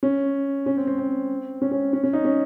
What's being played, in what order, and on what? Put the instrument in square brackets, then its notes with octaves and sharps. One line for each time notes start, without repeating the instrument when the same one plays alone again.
[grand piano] C#4
C#4
C4
C4
C4
C#4
C#4
C#4
C#4
D#4
C#4